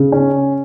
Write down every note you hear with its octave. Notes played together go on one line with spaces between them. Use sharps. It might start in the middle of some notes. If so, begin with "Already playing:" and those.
Already playing: C#3
C#4